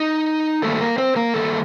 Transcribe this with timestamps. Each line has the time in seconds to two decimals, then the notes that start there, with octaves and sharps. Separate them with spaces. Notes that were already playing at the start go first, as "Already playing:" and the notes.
Already playing: D#4
0.62 G2 D#3 A3 A#3 A4
0.80 A#3 A#4
0.98 C4 C5
1.16 A#3 A#4
1.34 G2 D#3 A3 A#3 A4